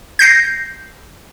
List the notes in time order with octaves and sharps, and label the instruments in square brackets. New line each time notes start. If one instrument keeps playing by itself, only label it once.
[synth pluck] G6 A#6 C7